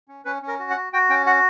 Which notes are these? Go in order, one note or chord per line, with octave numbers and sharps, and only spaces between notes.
C#4
C#4 B4
C#4
A#4
F#4
F#5
F#4
F#4 G5
C#4 G5
F#4 F#5